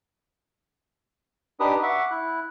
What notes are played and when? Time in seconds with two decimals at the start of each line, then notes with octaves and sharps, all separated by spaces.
1.60 D4 D#4 G4 B4 D#6
1.83 E5 F#5 C#6 D6
2.11 E4 F#6